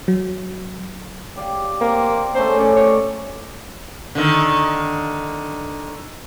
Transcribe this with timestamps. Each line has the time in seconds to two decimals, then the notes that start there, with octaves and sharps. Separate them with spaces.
0.08 F#3
1.36 G4 D5 F5
1.81 A#3 C4
2.35 A3 C#4 C5 A#5
2.59 C#4 D5
2.76 C#5 D6
4.15 D3 D#3